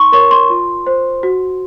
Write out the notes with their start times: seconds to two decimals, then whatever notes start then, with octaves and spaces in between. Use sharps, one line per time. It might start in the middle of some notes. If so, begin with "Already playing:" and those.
Already playing: D#4 C6 C#6
0.12 A#4 C#5 C#6
0.31 C6
0.50 F4
0.87 C5
1.23 F#4